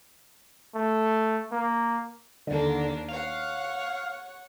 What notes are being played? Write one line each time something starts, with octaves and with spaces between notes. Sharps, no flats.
A3
A#3
D#2 D3 A#3 D4
C#5 F5 F#5